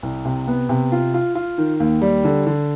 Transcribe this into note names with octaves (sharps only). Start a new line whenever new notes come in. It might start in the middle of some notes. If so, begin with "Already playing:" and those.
C2
C3
B3
C3
F4
F4
F4
D#3
D#2
G3
D3
D3